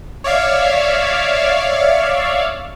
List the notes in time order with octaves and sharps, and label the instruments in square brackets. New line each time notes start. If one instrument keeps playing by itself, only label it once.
[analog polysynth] C#5 D5 E5 F5